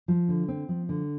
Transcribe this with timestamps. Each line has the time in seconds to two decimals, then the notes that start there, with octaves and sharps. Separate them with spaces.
0.08 F3
0.29 D3
0.48 C4
0.69 F3
0.89 D3